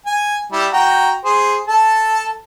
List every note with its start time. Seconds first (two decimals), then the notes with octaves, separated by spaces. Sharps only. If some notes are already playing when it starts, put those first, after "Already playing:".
0.06 G#5
0.52 G3 E4
0.72 F#4 G5 A#5
1.24 G#4 C5
1.68 A4 A5